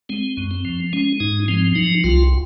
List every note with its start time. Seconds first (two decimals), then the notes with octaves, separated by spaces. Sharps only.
0.09 G#3 C4
0.37 F#2
0.51 C4
0.65 F3
0.93 G#3 C#4
1.20 G#2 D#4
1.48 F3 C4
1.75 F#3 D#4
2.04 C2 F4